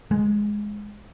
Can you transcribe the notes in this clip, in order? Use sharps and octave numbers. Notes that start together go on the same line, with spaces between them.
G#3